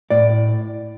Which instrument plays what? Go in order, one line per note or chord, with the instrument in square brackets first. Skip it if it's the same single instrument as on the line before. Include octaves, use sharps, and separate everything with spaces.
[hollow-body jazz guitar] A2 D5